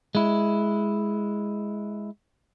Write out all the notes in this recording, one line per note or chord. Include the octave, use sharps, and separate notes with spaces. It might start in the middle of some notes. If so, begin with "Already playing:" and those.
G#3 E4